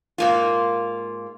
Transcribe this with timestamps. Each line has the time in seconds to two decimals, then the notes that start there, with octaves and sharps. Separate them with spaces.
0.18 G#2 A#3 F4